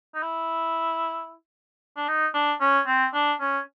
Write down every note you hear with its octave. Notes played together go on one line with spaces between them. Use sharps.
D#4
E4
D4
D#4
D4
C#4
C4
D4
C#4